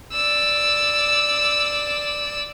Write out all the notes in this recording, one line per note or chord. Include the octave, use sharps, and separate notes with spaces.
D5 E6